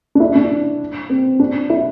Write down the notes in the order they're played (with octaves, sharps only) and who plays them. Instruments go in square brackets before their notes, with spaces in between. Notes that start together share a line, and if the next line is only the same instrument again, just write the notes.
[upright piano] D4
E4
D4
C4
D4
E4